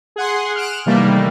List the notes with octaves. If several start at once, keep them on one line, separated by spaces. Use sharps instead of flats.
G#4 F#5 C6
F6 F#6 D7 E7
C3 D#3 E3 G3 A3 A#3